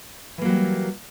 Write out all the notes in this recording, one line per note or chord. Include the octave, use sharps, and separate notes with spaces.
E3 F#3 G3 A#3